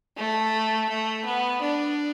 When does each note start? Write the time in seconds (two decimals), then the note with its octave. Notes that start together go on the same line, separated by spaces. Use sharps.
0.17 A3
0.89 A3
1.25 B3
1.62 D4